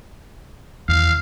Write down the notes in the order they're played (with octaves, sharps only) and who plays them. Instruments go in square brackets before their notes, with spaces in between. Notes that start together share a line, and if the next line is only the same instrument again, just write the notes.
[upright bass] E2 D#3 [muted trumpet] F5